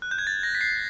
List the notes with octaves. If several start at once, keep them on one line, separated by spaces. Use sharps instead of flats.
F#6
G6
G#6
A6
A#6
B6
C7